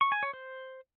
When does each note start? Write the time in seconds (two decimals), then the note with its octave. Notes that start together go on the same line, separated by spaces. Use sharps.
0.01 C#6
0.12 G#5
0.23 C#5
0.33 C5